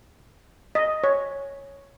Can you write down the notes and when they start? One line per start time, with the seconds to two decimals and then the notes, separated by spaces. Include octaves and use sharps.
0.75 D#5
1.04 C#5